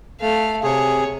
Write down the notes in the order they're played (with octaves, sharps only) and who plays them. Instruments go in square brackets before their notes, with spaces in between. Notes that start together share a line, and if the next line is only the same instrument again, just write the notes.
[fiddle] A3 F5
[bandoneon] C3 G#4 [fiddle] C#5